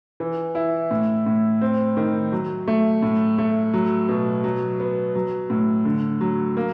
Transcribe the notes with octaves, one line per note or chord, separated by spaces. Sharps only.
E3
E4
A2
A2
C4
D#3
F#3
A3
A2
A3
F#3
B2
F#3
B3
F#3
A2
D3
F#3
A#3